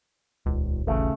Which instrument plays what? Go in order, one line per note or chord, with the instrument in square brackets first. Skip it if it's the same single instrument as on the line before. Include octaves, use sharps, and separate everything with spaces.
[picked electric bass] D#1 [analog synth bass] C#2
[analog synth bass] A1 [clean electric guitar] C#3 A3